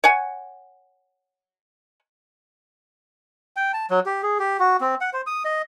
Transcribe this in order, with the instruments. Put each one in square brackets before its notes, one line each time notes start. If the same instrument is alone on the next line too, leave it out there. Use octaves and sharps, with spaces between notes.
[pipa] C#5 F#5 G#5
[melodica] G5
A5
F#3
G4
G#4
G4
F#4
C4
F#5
C5
D#6
D#5